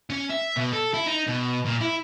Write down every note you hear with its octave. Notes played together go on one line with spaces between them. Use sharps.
C#4
E5
B2
A4
E4
D#4
B2
A#2
E4